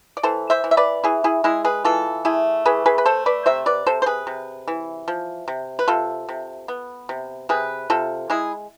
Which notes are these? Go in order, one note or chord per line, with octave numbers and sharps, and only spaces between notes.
D5
E3 A4 C5
C5 E5
E3
E5
B4 D5
E3 E4 G#4
E4 G#4
G#3 E4 G#4
G#4 B4
E3 F4 A4
A3 E4 G#4
E3 G#4 B4
G#4 B4
B4
A3 A4 C5
B4 D5
C3 C5 E5
B4 D5
C3 A4 C5
C5
G#4 B4
C3
E3
F3
C3
B4
C3 F4 A4
C3
B3
C3
C3 G#4 B4
C3 F4 A4
G#3 E4 G#4